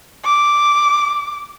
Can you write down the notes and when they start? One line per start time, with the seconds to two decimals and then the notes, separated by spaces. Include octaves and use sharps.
0.25 D6